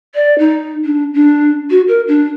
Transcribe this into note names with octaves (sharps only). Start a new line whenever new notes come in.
D5
D#4
D4
D4
F#4
A#4
D4